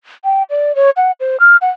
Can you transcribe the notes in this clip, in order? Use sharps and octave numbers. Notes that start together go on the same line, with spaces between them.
G5
D5
C#5
F#5
C5
F6
F#5